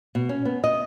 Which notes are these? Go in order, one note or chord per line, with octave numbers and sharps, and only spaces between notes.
B2
C#4
B3
D#5